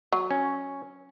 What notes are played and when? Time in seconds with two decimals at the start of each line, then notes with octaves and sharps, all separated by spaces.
0.12 F#3
0.31 C#4